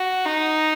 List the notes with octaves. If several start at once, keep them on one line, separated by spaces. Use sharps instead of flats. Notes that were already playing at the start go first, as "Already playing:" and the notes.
Already playing: F#4
D#4